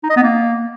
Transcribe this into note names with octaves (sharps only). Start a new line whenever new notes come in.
D#4
D#5
B3
A#3